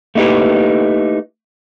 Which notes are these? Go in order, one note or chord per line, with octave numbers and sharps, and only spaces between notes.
A3 A#3 D#4 E4 G4 B4